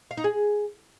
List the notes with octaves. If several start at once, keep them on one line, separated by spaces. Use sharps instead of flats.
F5
D#4
G#4